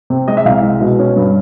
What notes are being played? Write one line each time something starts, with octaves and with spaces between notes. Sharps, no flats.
C3
G#3 D#5
E5
C2 F5
G#3
B2
C#4
G2